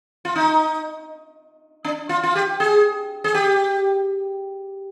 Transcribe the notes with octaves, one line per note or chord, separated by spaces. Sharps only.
F4
D#4
D4
F4
F4
G4
G#4
G#4
G4